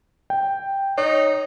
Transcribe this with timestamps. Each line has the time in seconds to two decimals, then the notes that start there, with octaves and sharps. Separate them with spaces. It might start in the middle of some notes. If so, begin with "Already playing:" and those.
0.30 G5
0.98 D#4 C#5